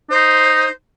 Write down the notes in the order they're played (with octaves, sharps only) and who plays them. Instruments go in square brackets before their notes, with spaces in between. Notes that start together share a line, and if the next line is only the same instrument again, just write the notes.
[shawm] D#4 [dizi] C5